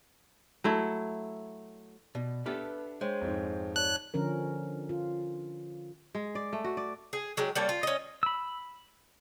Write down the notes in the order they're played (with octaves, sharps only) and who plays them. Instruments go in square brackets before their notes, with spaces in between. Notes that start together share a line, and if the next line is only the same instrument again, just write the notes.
[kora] F#3 A3 E4
[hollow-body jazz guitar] B2 [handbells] D5
[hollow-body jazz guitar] B3 G4 A4 [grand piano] D4 E5 F6 [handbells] B4
[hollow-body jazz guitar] G#3 [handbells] C5 C#5 G5
[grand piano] F2 G#2
[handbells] C#5 D5 A5 [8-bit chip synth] F#6
[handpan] D3 F3 C#4 A#4
F4
[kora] G#3
D5
A3
F#4
D5
[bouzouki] G#4
F#3 G#3 G4
G3 A#3 C#4 A4
F4
C#4 D#5
[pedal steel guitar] B5 E6